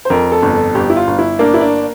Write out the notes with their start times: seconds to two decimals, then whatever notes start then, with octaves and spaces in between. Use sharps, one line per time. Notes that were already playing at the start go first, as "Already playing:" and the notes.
0.05 C5
0.10 F2 A#4
0.32 A4
0.42 G1
0.54 A4
0.75 G1 G4
0.90 E4
0.96 F4
1.07 G1
1.19 E4
1.39 A#3 D4
1.54 E4
1.61 D4